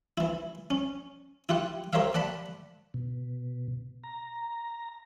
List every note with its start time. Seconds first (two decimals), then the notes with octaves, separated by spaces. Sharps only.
0.18 E3 E4
0.70 C#4
1.49 E4 F4 G4 F#5
1.93 G4 A#4 C5 C#5 E5 F5
2.14 D5 F#5 A5 B5
2.94 B2
4.04 A#5